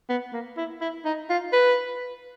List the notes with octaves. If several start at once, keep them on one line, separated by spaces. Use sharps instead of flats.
B3
A#3
E4
E4
D#4
F4
B4